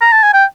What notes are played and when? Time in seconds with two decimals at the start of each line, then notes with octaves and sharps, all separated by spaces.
0.01 A#5
0.12 A5
0.23 G#5
0.34 G5